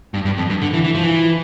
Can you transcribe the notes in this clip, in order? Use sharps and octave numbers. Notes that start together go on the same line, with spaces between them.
G2
G2
F2
G2
D3
E3
E3
F3
E3